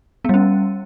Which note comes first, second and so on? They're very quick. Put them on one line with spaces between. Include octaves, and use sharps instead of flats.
B3 G3 C#4